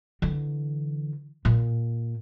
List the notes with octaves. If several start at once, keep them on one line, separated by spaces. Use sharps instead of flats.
D3 E3
A#2